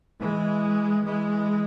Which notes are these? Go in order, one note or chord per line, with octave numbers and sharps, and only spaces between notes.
E3 G#3
E3 G#3